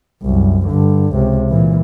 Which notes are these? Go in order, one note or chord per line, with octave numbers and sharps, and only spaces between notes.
C2 F#2
G2 D3
C#2 C3
A#2 E3